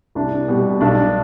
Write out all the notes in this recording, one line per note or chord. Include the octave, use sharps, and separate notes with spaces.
C2 D4
B2 G3
B1 D4